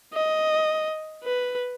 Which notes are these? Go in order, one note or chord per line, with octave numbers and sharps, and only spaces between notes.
D#5
B4